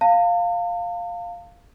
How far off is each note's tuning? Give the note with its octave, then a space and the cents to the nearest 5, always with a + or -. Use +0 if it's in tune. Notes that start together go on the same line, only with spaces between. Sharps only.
F5 +0 A5 +45